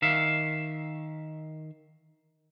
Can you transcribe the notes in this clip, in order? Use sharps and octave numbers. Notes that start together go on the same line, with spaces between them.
D#3 E5 F5